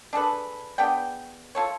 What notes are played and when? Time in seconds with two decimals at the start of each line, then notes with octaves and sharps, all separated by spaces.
0.13 D4 G#4 A4 B4
0.78 B3 D4 G#4 G5
1.55 F4 A4 C#5